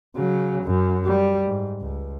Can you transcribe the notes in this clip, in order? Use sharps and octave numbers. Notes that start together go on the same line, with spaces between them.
C#3 F#3
F#2
G3
G#2
C#2